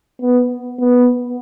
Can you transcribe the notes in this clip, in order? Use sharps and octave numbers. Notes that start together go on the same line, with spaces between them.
B3
B3